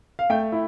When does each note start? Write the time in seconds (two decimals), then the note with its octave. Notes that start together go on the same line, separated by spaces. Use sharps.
0.19 F5
0.30 A3 G5
0.52 E4